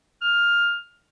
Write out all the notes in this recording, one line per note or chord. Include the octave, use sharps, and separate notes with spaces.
F6